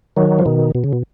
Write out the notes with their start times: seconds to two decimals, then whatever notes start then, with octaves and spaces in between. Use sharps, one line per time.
0.17 D#3 F#3
0.39 F3
0.46 B2 D#3
0.75 B2
0.84 C#3
0.93 B2